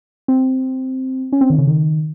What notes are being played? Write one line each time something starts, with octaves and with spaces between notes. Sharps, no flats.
C4
C#4
C4
D#3
C#3
D#3